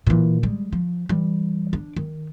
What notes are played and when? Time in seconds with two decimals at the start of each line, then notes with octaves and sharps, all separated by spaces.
0.07 A#2 E3
0.43 G3 G#3
0.73 F3
1.09 E3 G3
1.73 D4
1.96 D#3